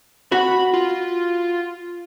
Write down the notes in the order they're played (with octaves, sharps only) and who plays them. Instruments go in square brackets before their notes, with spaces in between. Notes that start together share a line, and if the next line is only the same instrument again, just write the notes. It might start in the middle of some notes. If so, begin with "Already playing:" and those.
[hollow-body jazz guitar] F#4 [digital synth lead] B5
[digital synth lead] F4